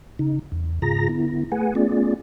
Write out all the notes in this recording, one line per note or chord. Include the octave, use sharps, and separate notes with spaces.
C#3 D#4
E2
G#2 C#3 F4 G#4 A#5 A#6
D3 B3 E4
A3 G#4 B4 F#5 G#5
A3 B3 C#4 F4 G#4 D5